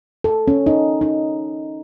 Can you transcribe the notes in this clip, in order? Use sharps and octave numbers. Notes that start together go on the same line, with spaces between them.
A4
C#4
D#4
D#4